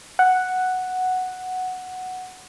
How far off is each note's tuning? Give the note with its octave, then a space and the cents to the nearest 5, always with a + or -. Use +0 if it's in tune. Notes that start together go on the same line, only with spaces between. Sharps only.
F#5 +0